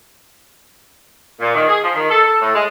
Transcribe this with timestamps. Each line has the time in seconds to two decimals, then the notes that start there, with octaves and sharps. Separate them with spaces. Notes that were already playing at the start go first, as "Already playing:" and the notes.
1.40 A#2
1.54 D#3
1.67 G#4
1.83 F3
1.95 D#3
2.09 A4
2.24 A4
2.40 A2
2.54 G#3